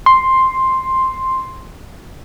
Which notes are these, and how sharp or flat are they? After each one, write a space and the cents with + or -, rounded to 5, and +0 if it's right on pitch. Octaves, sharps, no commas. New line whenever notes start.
C6 +5